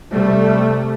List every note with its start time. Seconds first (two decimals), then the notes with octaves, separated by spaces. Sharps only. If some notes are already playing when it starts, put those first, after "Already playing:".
0.13 C3 G3 A3